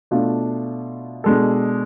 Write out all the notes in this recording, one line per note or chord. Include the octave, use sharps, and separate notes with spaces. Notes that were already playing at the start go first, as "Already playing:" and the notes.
B2 A3 D4 F4
B2 G#3 D4 A4